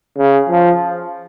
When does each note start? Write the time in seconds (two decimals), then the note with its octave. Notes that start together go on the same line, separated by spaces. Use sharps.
0.18 C#3
0.49 F3